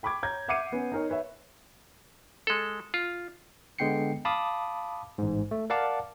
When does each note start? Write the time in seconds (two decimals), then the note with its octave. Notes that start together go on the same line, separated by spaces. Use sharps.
0.03 G5 B5 C#6 D6 G#6
0.23 C#5 A#5 G6 G#6
0.48 E5 F#5 D6 C7 C#7 D#7
0.72 B3 C#4
0.92 D#4 A#4 C#5
1.10 B4 C#5 E5
2.47 G#3 A4
2.94 F4
3.79 D3 G#3 B3 G5 C7 C#7
4.25 F5 A5 B5 D6 D#6
5.18 A1 G#2
5.51 A3
5.70 A#4 D5 F5 F#5 A5 D6